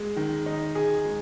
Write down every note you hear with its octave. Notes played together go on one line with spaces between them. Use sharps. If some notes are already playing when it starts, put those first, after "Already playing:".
Already playing: G#3
D#3
D#4
G#4
G#3